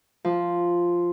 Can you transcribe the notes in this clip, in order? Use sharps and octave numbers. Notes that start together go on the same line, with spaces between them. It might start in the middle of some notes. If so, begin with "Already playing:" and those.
F3